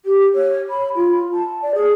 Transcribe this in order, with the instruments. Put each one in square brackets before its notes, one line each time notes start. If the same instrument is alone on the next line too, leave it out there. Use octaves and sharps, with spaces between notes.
[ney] G4
C#5
B5
F4
A5
D5
G#4